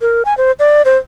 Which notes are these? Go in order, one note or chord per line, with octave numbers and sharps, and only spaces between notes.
A#4
G#5
C5
D5
C5